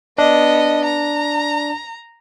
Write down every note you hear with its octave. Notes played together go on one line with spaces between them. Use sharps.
B3 D4 D#5
A#5